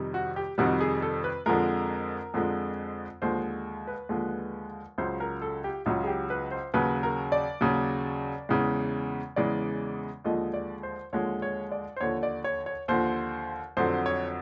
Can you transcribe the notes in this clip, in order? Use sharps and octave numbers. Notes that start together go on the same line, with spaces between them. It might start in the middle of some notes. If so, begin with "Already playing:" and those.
Already playing: F2 C3 D#3 G3
F#4
G4
F2 C3 D#3 G3 F#4
G#4
A4
B4
F2 D3 F3 G#3 A#4
F2 D3 F3 G#3
D#2 D3 F3 G#3 C5
B4
D#2 D3 F3 G#3
C#2 C#3 F#3 C5
A#4
A4
G4
C#2 C#3 F#3 F4
G#4
G4
B4
C5
D#2 C#3 F#3 B4
A#4
D5
D#2 C#3 F#3
E2 C#3 E3 G#3
E2 C#3 E3 G#3 D5
D#2 D3 F3 G#3 D#5
D5
C5
D#2 D3 F3 G#3 C#5
C#5
D5
C5
D#2 D3 F3 C#5
D5
C#5
C#5
D#2 D3 F3 C5
F2 D3 F#3 C5
C#5